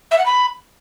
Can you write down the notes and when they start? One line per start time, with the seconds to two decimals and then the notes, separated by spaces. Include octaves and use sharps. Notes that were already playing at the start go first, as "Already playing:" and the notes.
0.11 E5
0.18 F#5
0.25 B5